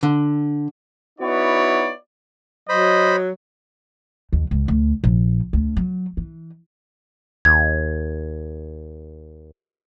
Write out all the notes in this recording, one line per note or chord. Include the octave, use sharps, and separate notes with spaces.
D3
B3 D#4 E4 F#4 C#5 D5
F#3 C5 D#5 B5
D#2
C#2
D2
A#1
D2
F#3
E3
D#2 G#6